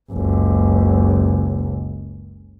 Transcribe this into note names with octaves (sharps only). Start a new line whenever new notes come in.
F#1 C#2